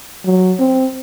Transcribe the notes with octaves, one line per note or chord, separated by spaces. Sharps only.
F#3
C4